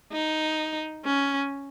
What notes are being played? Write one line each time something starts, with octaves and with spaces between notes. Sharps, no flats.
D#4
C#4